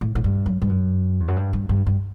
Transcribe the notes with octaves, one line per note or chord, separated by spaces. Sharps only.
A2
A2
G2
F#2
G2
F#2
E2
F#2
G2
G2
G2
G2